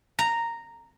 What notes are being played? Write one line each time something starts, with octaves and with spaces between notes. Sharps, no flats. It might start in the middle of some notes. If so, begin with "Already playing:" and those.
A#5